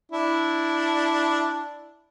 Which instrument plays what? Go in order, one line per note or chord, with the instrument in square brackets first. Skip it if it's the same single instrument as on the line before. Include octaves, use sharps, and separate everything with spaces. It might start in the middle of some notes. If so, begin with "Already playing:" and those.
[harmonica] D4 E4